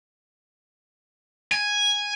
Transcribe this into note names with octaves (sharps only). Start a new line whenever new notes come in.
G#5